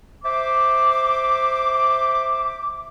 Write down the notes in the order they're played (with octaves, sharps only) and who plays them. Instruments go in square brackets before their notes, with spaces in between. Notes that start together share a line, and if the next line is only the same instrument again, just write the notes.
[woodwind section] C5 E5 D6